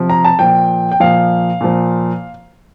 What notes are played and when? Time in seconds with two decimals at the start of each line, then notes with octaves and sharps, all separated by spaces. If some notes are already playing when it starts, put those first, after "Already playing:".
Already playing: C3 F3
0.10 A#5
0.25 A5
0.39 A#2 F3 G5
0.91 G5
1.00 A#2 F3 F5
1.61 A#2 F3